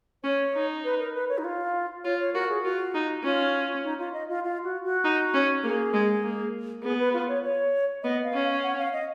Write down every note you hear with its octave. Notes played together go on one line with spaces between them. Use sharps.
C#4 C#5
D#4
B4
A#4
B4
C#5
D#4
F4
F4 C#5
C#5
F#4 A#4
G#4
F4 F#4
D#4
C#4 F4
D#4
F4
D#5
F4
F4
F#4
F#4
D#4
C#4
A#3 G#4
G#3
A#3
B3 G#4
B4
F4
C#5
C#5
B3 D#5
F5
C#4
F5
F#5
F5
D#5